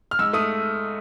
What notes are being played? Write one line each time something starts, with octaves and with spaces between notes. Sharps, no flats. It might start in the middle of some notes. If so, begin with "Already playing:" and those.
F6
G#2 E6
A3 D#6